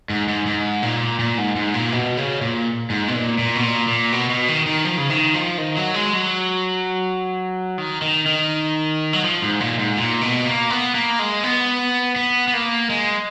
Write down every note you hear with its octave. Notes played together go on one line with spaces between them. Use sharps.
G#2
G#2
G#2
A#2
A#2
G#2
G#2
A#2
B2
C#3
A#2
G#2
B2
A#2
A#2
B2
A#2
A#2
B2
B2
D#3
D#3
F3
C#3
D#3
F3
D#3
F#3
G#3
F#3
D#3
D#3
D#3
F#3
F3
G#2
A#2
G#2
A#2
B2
A#3
B3
A#3
G#3
B3
B3
B3
A#3
G#3